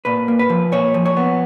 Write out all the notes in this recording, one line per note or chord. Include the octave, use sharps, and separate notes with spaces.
A#2 B4
A#3
B4
F3
A#2 C#5
F3
C#5
B3